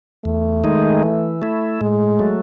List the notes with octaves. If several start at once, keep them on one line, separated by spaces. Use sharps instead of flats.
E2 A3
D#3 G#3 D#4
E3
A3 E4
A2 G#3
F#3 A3